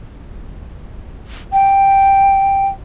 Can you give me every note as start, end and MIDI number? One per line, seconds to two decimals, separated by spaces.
1.53 2.68 79